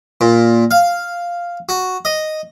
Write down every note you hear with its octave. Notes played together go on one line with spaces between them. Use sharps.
A#2
F5
F#4
D#5